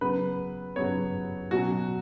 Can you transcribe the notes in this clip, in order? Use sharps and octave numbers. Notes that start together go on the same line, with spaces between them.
C#3 F#3 B3 B4
C#3 F#3 B3 C#5
B2 F#3 C#4 F#4